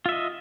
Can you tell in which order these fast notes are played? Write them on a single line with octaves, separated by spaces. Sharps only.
F4 E5 D#5